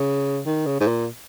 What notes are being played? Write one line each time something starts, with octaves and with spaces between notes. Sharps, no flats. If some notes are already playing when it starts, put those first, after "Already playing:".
Already playing: C#3
D#3
C#3
G#2
A#2